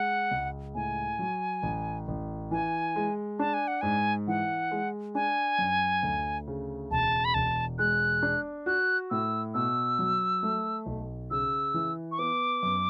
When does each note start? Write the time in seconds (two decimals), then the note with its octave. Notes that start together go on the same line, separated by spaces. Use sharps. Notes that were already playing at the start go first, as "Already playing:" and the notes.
Already playing: G#3 F#5
0.31 C#2
0.75 A2 G#5
1.19 F#3
1.63 A1
2.08 A1
2.51 E3 G#5
2.96 G#3
3.39 D4 A5
3.54 G#5
3.68 F#5
3.81 G#2 G#5
4.28 E3 F#5
4.71 G#3
5.15 D4 G#5
5.59 F#2
6.03 D2
6.47 C#3
6.91 E1 A5
7.25 B5
7.34 E1 A5
7.79 G#3 F#6
8.22 D4
8.66 F#4 F#6
9.11 A2 E6
9.54 B2 E6
9.99 F#3
10.43 A3
10.86 B1
11.31 C#3 E6
11.74 E3
12.12 C#6
12.18 B3 D6
12.63 F#2